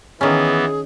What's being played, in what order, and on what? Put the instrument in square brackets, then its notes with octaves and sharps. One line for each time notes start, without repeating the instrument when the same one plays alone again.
[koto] D#3 C#4 [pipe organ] E3 B3 [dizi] G#4